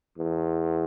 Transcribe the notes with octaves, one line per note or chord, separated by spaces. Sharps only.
E2